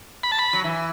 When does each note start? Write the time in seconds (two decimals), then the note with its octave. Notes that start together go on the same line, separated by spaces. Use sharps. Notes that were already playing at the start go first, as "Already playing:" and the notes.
0.23 B5
0.32 A5
0.39 B5
0.53 F#3
0.64 E3